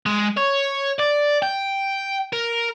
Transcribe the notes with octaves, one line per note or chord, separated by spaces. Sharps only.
G#3
C#5
D5
G5
A#4